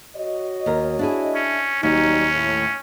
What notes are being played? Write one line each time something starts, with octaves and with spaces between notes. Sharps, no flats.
F#4 C#5 D#5
D#2 A#4
D4 E4 G#4
C#4
D#2 F#3 G3 C#4 D#4
A2